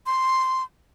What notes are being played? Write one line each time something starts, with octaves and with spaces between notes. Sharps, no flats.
C6